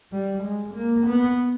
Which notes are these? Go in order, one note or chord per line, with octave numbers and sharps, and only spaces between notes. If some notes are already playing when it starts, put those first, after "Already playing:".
G3
G#3
A#3
B3